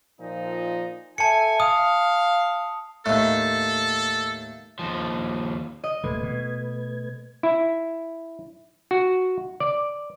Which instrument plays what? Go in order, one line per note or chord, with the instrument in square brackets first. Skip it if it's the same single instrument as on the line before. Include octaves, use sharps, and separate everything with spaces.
[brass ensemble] A#2 F3 D#4
[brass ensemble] A4 E5 G#5 [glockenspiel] A5 C#7
[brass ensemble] F5 [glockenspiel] D#6
[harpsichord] D#2 A2 [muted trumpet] A4
[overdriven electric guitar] D#2 F3
[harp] D#5
[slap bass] D#1 C3 [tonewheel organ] A3 B4 G#6
[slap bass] B2
[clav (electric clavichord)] E4
F#4
D5